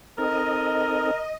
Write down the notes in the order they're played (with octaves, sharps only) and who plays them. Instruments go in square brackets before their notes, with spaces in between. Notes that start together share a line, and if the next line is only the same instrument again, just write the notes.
[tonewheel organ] C4 D#4 A4 [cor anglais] A#4 [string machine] D#5